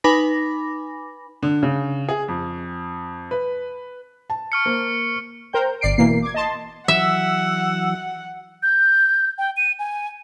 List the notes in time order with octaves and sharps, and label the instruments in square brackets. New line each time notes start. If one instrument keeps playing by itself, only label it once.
[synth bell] D#4 B4 G#5 B5 D6 A#6
[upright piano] D3
C#3
G#4
F2
B4
[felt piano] A5
[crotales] C#6 F6 C#7
[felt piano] A#3 C5
[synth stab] A#4 C5 G5 G6
G1 D5 C7 D7
B2 E3 A#3 C7
D6 G#6
D#5 A5 C6
[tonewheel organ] E3 F#3 [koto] E5 [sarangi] F#5 [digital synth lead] E6
[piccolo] G6
G5
D#7
G#5